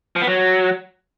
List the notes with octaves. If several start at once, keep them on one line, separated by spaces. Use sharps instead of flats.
F3
B3
F#3